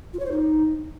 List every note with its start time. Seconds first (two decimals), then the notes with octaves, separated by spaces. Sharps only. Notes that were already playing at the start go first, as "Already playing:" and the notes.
0.13 F4
0.19 C#5
0.26 C5
0.32 D#4